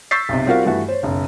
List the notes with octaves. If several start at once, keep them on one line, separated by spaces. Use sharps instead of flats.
C#6 E6 G6 A6 B6 C7
B1 C3
G3 C4 F4 F#4 A#4 F5
G2 E3 A3 F#4
C5 C#5
F#1 B1